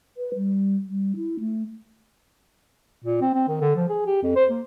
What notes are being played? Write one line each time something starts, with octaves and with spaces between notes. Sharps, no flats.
B4
G3
G3
E4
A3
A#2
C4
C4
D#3
D3
F3
G#4
G4
F2
C5
A#3